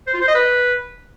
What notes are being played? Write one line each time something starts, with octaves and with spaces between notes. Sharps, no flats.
C5
F4
C5
D#5
B4